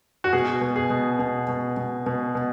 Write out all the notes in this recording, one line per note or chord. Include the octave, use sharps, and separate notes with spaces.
F#4
B2 G#4
B2
G#4
B2
B2
B2
B2
B2
B2